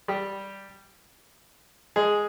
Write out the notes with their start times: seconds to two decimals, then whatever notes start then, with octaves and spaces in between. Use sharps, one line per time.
0.08 G3 G4
1.96 G#3 G#4